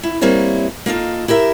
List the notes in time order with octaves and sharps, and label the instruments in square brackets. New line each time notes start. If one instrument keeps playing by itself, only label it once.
[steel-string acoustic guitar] E4
G3 A#3 C4 E4 C#5
A#3 D#4 F4 A4
E4 G4 A#4 E5